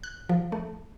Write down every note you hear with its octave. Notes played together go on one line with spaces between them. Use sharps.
F#6
F3
A3